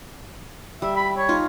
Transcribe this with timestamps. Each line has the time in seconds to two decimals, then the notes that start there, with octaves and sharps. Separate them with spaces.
0.82 G3 E5
0.96 B5
1.17 C#5
1.29 D#4 F4